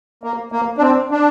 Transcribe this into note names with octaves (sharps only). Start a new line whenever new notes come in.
A#3
A#3
D4
C4
D4